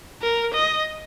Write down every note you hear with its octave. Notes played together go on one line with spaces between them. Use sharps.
A#4
D#5